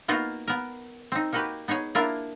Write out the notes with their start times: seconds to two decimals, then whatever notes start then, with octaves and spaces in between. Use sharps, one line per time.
0.08 A#3 B3 D#4 F4 F#4
0.47 B3 A#4
1.12 C4 D#4
1.33 A#3 D#4 F#4 G4 B4
1.68 B3 D#4 G#4 C#5
1.95 A#3 D4 E4 F4 A#4